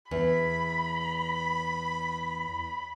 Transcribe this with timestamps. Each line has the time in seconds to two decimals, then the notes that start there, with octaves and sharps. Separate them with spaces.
0.11 E2 B5